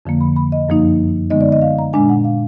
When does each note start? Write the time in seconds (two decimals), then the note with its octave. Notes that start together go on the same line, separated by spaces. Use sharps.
0.05 F2 D3 F3 A#3
0.21 B5
0.36 B5
0.52 D#5
0.69 F#2 F3 A#3 D#4
1.30 D3 G#3 B3 D#4 D#5
1.41 D5
1.52 D#5
1.62 F5
1.79 A#5
1.93 A#2 G#3 D4 G#5
2.10 F#5
2.24 F5